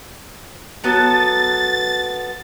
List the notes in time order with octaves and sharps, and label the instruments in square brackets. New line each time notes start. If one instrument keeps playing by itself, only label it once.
[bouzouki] F#3 B3 A4 [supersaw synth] A6